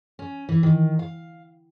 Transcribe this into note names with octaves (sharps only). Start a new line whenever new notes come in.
C#4
E3
D#3
F5